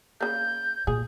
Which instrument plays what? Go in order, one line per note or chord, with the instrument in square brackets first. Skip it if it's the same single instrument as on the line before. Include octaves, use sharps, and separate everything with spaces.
[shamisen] C#3 A#3 [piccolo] G6
[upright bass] A#2 [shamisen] G#4